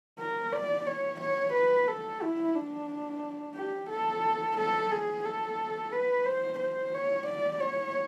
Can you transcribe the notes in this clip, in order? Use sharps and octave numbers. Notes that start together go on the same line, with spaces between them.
A#4
D5
C#5
C#5
B4
A4
E4
D4
G4
A4
A4
G#4
A4
B4
C5
C5
C#5
D5
C#5